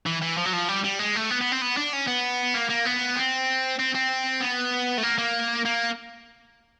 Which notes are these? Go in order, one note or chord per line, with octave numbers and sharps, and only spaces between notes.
E3
E3
F3
F#3
F3
G3
G3
G#3
A3
B3
B3
C4
B3
D4
C#4
B3
A#3
A#3
B3
C4
C4
C4
B3
A3
A#3
A#3
A#3